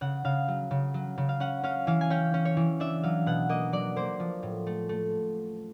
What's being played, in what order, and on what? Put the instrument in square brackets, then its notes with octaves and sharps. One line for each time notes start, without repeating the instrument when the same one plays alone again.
[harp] C#3 F#5
C#3 F5
F#3
C#3
F#3
C#3
F5
C#4 F#5
C#4 F5
E3 F5
G#5
C#4 G5
C#4
C#5
E3
D4 E5
F#3 F5
B2 F#5
A#3 D#5
F#3 D5
A#3 C5
F3
A2
A3
A3